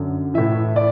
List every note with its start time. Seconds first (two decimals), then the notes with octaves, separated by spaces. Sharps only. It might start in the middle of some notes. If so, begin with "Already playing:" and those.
Already playing: F#2 D3
0.34 A2 E3 E5
0.76 D5